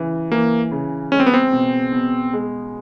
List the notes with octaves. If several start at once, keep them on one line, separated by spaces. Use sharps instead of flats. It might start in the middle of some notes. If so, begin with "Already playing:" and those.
Already playing: C#3 E3
E3 A#3
C#3
G#3 C#4
C4
B3
C4
B2
B2
G#3